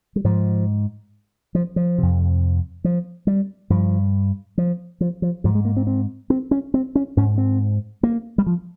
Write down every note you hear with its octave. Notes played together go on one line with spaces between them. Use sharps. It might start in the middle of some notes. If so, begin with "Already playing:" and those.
G3
G#2 F3
F3
F3
F2 C3
F3
G3
G2 F3
F3
F3
F3
G#2 F3
G#3
A#3
C4
C4
C4
C#4
C4
C#4
G#2 C#4
C4
A#3
G3
F3